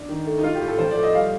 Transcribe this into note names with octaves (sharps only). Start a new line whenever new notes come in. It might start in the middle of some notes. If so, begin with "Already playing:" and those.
Already playing: D4
D#3
A3
D#4
A3 F4
G4
A2
A4
F3 C5
D5
A3
D#5
G3 F5